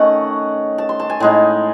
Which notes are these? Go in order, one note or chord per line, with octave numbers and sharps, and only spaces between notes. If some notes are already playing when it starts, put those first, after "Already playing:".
Already playing: D#3 A3 C#4 C#5 D#5 F#5
A5
C6
A5
G#5
A2 G#3 D#4